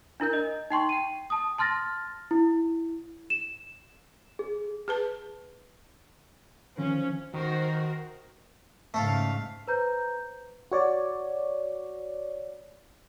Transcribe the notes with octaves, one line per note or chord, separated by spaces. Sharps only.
D4 E4 A#4 G6
D#5
D#4 G5 C6 C#6
G5 D#7
A5 D#6
A5 C6 F6 A6 A#6
E4
E7
G#4
G#4 B4 A5
D#3 F3 C#4
D#3 F#4 A#4 C5
G#2 C#3 A3 A4 F5
B4 C5 A#5 G6
F#4 C#5 D5